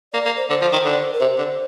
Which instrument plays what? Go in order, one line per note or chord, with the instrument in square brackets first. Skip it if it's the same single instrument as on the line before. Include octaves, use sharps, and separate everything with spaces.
[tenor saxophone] A#3 [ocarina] D5
[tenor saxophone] A#3
[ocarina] C5
[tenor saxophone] D3 [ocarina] C5
[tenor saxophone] F3
D#3
D3
[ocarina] A#4
[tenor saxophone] C3 [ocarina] C5
[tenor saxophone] D3